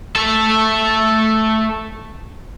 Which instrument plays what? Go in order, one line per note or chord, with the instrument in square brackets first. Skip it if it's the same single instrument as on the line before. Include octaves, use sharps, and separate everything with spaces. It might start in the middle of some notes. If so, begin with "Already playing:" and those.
[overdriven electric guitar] A3 A4